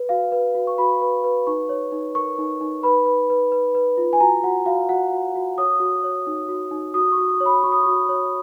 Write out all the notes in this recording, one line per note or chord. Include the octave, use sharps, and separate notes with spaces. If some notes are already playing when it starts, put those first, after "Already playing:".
Already playing: B4
F#4 F5
B4
F#4
C#6
F#4 B5
B4
B4
D#4 C#6
C#5
D#4
A#4 C#6
D#4
D#4
B4 B5
B4
B4
B4
B4
F4
G#5
F#4 A#5
F#4 F#5
F#4 F5
F#4 F#5
F#4
F#4
C#5 D#6
F#4
C#5
D#4
F#4
D#4
F#4 D#6
C#6
F#4
D#6
C#5
B5
F#4 C#6
D#6
F#4 C#6
C#5